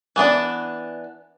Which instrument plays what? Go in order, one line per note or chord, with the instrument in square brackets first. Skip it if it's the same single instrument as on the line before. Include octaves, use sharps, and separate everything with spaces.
[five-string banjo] E3 B3 D4 D5